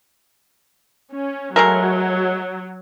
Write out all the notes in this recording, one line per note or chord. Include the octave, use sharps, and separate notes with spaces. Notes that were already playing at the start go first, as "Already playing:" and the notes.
C#4
F#3 G#3 A3 A#4